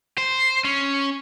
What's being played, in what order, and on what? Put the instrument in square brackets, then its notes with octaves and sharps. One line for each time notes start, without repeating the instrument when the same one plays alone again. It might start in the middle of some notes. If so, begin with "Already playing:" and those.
[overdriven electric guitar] C5
C#4